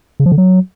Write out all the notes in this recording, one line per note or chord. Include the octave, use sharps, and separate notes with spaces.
C#3
F3
D3
F#3